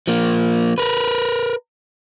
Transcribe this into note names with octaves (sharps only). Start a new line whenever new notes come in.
F3 A#3
A#4 B4